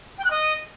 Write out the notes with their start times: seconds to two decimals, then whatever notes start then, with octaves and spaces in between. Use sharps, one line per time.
0.18 G5
0.24 F#6
0.31 D#5